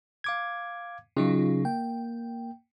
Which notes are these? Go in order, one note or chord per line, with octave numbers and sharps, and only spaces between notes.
F5 D6 G#6
C#3 F#3 D#4 F4
A#3 G5